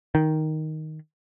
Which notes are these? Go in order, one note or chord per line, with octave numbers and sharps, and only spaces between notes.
D#3